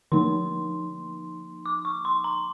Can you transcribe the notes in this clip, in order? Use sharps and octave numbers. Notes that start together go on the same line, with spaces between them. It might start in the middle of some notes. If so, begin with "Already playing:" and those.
D3 F3 A#3 D#4 C6
D6
C#6
C6
A#5